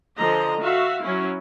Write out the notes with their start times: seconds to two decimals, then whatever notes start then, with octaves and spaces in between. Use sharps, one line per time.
0.18 D3 F3 D#5 A#5
0.61 F#4 E5 F5
1.02 F#3 C#4 E4